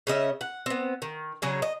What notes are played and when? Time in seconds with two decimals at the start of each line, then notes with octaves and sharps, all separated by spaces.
0.07 C#3 C#4 D#5 E5
0.41 F#5
0.66 B3 C4
1.02 D#3
1.42 C#3 F#3 G#4 C#5
1.62 D#5